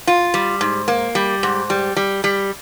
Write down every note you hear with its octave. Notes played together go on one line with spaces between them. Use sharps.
F4
G3
G#2
A#3
G3
G#2
G3
G3
G3